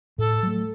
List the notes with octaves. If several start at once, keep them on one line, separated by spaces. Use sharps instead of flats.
A2 A4
F#3 A3